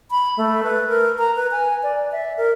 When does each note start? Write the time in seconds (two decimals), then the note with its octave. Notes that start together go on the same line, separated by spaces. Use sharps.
0.11 B5
0.37 A3
0.63 B4
0.88 A#4
1.19 A#5
1.36 B4
1.51 G#5
1.83 D5
2.12 E5
2.37 A#4